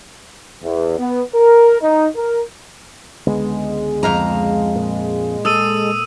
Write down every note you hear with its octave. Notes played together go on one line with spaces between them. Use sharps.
E2
B3
A#4
D#4
A#4
C#2 D3 G#3 B3
F2 F5 A#5
A#2
A4 D#6 E6 D#7